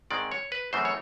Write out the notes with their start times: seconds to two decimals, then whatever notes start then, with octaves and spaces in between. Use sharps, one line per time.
0.11 G#2 D#3 G#3 C4 D5
0.32 C#5
0.52 B4
0.73 F#2 C#3 E3 A3 C4 C5
0.85 C#5